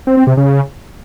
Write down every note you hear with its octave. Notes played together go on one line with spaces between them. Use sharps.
C4
C4
C3
C#3